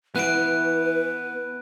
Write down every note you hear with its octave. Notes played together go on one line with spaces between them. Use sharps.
E3 B3 B4 F#6 D7